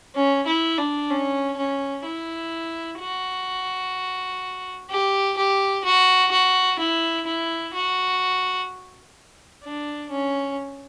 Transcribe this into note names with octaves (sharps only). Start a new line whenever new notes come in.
C#4
E4
D4
C#4
C#4
E4
F#4
G4
G4
F#4
F#4
E4
E4
F#4
D4
C#4